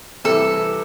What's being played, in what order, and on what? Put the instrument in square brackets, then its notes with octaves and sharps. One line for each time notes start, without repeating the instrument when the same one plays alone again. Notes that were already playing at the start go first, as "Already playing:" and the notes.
[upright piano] C3 E3 G3 [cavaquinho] A4